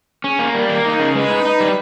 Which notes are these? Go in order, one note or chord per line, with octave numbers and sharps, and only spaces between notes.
C#4 G#4
A#3
G3 A#4
A#3
D#4
C#3
G#3 B4
D#4
D#4
G3